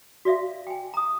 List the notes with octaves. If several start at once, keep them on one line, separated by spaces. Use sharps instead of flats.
F#4 D5 E5 F5
G5 G#5
A#5 D#6